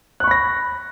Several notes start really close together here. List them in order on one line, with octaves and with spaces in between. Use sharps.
F#6 C#6 B5 A#6